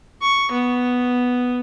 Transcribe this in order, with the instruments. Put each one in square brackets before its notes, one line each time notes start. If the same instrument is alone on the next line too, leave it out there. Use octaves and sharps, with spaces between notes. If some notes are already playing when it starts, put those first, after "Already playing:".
[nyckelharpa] C#6
B3